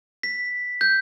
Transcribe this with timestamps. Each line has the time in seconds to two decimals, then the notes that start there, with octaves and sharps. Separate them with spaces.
0.23 B6
0.81 G6